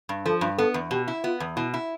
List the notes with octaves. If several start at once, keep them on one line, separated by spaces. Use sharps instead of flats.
G2
F3 A4
G2
B3 A4
E2
B2 G4
E4
B3 F4
E2
B2 E4
E4